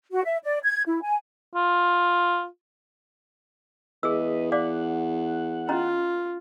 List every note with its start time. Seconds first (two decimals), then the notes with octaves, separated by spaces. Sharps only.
0.11 F#4
0.25 E5
0.43 D5
0.63 G#6
0.86 E4
1.02 G#5
1.55 F4
4.03 E2 G#4 B4 D#5 E6
4.52 D5 F5 F#5 D6
5.69 C#4 F4 D#5 A#5